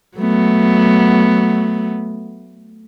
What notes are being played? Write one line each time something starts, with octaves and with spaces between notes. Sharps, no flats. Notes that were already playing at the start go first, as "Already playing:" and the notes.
F#3 A3 B3